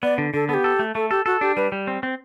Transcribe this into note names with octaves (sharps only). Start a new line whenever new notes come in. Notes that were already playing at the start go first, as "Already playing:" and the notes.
B3 D5
D3
D3 A4
B3 G4 A4
A4
A3
A3 A4
G4 A4
F#4 A4
D4 G4
G3 B4
G3
C4
C4